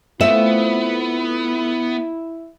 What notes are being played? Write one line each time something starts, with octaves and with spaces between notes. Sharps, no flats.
A3 B3 C4 E4 F4 E5